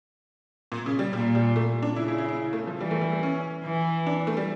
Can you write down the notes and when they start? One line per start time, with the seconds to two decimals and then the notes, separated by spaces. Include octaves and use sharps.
0.72 A#2
0.86 C#3
0.99 G3
1.13 A#2 G3
1.35 G3
1.56 A3
1.82 D4
1.96 C#3 E4
2.08 E4
2.18 E4
2.29 E4
2.53 A3
2.67 F3
2.80 E3 G3
2.91 A3
3.01 G3
3.12 A3
3.23 C#4
3.65 E3
4.06 D4
4.27 A3
4.37 G3